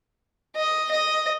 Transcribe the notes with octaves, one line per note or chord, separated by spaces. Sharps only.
D#5
D#5